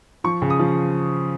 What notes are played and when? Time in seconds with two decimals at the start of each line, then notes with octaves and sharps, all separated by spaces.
0.24 F3 C#6
0.42 C#3
0.50 D#6
0.59 F3